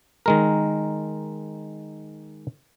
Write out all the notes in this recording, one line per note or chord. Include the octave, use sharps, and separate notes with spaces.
D#3 G#3 A#4